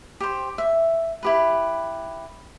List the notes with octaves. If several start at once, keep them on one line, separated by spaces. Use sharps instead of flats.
G4 C5
E5
E4 G4 B4